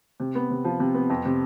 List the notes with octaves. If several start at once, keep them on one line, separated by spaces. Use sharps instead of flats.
C3
B3
C3
F3
C3
B3
F2
C3